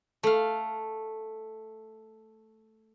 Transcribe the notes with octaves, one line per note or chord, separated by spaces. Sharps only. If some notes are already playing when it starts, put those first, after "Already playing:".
A3 F5